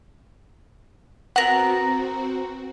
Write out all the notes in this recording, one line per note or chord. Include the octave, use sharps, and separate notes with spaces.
B3 C4 F#4 A#4 F#5